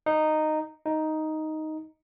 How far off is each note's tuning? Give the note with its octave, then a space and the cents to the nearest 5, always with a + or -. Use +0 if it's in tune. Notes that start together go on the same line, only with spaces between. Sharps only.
D#4 -10
D#4 +5